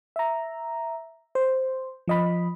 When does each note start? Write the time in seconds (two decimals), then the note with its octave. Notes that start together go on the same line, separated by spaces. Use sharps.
0.16 E5 A#5
1.35 C5
2.08 F3 D#5 B5